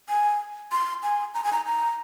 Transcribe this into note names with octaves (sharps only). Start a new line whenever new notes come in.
G#5
C6
G#5
A#5
G#5
A#5
A#5